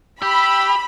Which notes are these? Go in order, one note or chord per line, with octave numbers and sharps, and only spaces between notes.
G4 B5 E6